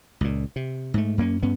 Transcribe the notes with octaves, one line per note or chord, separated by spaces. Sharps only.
C#2 A#2
C3
G#2 A3
F#2 A#3 C4 C#4
G2 B3 C#4